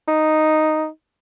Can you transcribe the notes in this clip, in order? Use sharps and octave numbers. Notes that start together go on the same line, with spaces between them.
D#4